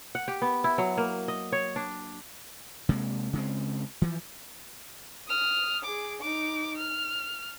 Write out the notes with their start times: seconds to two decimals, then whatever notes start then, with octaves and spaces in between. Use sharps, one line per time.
0.15 F#5
0.28 G4
0.42 B3
0.64 E4
0.78 F#3
0.97 A#3
1.28 D#5
1.52 C#5
1.76 D4
2.89 C3 G#3 A#3
3.33 C#3 G#3 C4
4.02 E3 F3
5.27 D#6 F6
5.84 G#4 D6
6.21 D#4 D6
6.77 F6